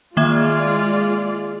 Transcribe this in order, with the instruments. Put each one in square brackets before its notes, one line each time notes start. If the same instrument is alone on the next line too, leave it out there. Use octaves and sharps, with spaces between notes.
[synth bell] D#3 A#3 E5 [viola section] G#3 F4 D5